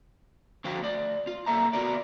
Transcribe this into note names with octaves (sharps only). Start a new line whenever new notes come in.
D3 F3 F#4 C5 F5 G5
A3 D5
F4
B1 A#3 A4 E5 A#5
B3 F4 F#4 A#4 D5